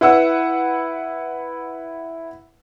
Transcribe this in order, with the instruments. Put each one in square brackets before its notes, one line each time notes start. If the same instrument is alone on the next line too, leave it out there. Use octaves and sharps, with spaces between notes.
[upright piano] E4 B4 F#5 E6